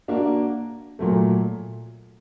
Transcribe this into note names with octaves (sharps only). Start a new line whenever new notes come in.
A#3 D4 F#4
A#2 F#3 A3